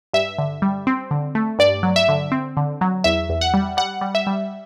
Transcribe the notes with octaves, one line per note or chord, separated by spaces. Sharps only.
G2 E5
D3
G3
C4
D3
A3
G2 D5
F#3
E5
D3
C4
D3
F#3
E2 E5
E2
F#5
G3
G3 F#5
G3
E5
G3